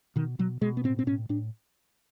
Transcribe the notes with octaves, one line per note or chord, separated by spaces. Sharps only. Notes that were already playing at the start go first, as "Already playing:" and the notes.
B2 D#3
B2 F#3
B2 G#3
B3
A2 C4
C4
A2 C#4
A2 D4